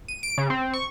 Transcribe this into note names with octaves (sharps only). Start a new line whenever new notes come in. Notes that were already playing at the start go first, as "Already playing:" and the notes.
D#7
D7
C#3
C4
C#6